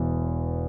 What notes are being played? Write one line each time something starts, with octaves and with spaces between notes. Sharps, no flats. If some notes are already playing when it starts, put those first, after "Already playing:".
Already playing: E1 E2 E3